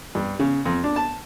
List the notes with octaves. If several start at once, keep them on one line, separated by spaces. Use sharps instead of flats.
G2
C#3
F2
D4
A5